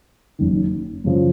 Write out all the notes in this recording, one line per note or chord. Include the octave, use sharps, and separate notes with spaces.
F#1 F#2 D#3
F#2 C#3 F3